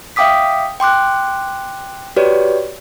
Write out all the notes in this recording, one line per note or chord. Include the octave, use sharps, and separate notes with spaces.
E5 F5 G5 D6 D#6 B6
G5 C6 D6 F#6
F#4 G4 B4 C#5 D5